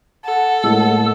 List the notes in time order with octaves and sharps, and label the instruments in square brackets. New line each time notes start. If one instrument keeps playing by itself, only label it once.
[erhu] A4 [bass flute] F#5
[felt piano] A2 G#3 A#3 [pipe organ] E6